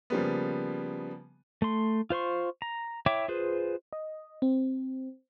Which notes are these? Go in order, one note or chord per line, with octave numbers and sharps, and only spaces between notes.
C#3 F3 G3 A#3 B3
A3 C6
F4 C5 C6 C#6
A#5
E4 C#5 E5 G5 D6
F4 G#4 B4 C5
D#5
C4